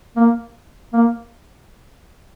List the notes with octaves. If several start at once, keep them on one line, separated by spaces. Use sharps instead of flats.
A#3
A#3